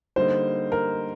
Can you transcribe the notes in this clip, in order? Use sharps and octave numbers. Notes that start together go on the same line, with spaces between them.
D3 G3 A#3 D#4 C5
A#4